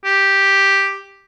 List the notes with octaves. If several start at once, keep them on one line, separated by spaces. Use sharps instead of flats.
G4